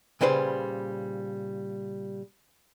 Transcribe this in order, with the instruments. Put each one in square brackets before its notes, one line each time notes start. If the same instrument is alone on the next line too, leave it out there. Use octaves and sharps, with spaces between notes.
[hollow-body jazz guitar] A#2 C#3 G3 B4 C5